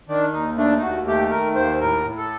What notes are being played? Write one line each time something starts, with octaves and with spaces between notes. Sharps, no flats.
D#3 D4
D#2 D#4
A3 D4
D#4
D#2 F#4
A3 G4
D#3 A#4
D#2 C5
A2 A#4
A2
A4